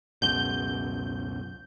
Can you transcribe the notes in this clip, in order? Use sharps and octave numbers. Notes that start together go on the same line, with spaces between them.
C#2 F#2 B2 G6